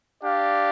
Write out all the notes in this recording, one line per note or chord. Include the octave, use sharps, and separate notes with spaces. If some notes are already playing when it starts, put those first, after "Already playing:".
D4 G4 D5 F5